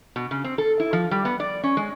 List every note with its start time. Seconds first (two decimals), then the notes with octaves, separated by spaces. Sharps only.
0.16 B2
0.31 C#3
0.44 C4
0.58 A4
0.80 E4
0.93 F3
1.11 G3
1.25 B3
1.40 D5
1.63 C#4
1.77 G#3